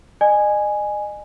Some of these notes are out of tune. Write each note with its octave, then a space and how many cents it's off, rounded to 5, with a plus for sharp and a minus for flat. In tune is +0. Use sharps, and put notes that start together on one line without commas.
D#5 -35 G#5 +0